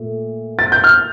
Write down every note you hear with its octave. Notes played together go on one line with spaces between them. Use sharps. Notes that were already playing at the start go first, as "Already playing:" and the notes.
Already playing: A#2 A3
A6
G6
F6